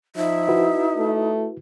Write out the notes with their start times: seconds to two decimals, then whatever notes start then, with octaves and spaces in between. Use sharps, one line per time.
0.16 F3 D#4 E5
0.48 E4 F#4 B4
0.98 A3